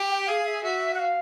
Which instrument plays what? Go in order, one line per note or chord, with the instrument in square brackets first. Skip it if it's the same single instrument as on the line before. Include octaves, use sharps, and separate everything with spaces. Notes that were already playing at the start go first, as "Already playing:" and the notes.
Already playing: [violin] G4
[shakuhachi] G5
[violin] G#4 [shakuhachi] F5
[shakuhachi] E5
[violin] F#4 [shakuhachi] E5
[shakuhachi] F#5
F5